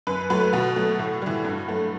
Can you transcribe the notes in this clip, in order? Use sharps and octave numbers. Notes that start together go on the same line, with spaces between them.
F#2 B4
F#3 A3 B4
B2 F#4
F#3 A3
A2
E3 G3
G2
F#3 A3